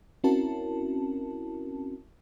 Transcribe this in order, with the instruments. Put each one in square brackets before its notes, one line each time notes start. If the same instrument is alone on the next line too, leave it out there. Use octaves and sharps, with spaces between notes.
[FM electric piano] C4 C#4 E4 F#4 A#4 A5